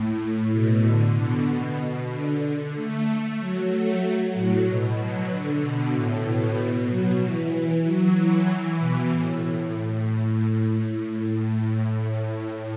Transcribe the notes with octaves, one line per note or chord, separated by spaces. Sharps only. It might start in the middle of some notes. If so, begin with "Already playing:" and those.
Already playing: A2
B2
D3
B2
B2
D3
D3
A3
F#3
A3
F#3
A2
B2
F#3
D3
B2
A2
B2
F#3
E3
F#3
E3
B2
A2